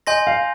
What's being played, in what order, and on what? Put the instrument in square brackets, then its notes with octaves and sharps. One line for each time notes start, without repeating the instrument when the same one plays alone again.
[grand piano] D#5 [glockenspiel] G#5 C6 G6 A#6
[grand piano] F5